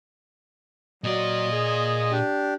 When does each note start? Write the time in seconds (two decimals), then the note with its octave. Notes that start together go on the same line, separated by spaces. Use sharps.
1.04 A#2 F#3 D5 D#5
1.52 G#4
2.11 D4 G4